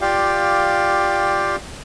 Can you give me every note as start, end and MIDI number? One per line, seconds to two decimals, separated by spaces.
0.01 1.56 65
0.01 1.56 67
0.01 1.56 74
0.01 1.56 77
0.01 1.56 79